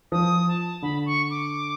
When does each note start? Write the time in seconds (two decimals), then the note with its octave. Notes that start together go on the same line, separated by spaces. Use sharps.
0.12 F3 D#6
0.48 A5
0.82 D3 B5
1.06 C#6
1.30 D6